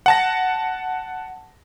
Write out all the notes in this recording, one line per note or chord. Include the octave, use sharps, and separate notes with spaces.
F#5 A5 A#6